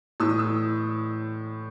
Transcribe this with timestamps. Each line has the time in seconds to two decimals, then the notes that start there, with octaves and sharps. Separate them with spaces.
0.20 A2 E3 E6
0.29 D#6
0.39 E6